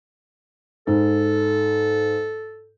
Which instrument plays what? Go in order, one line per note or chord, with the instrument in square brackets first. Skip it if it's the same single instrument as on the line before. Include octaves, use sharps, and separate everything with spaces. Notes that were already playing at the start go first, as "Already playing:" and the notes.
[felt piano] G#2 [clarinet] A4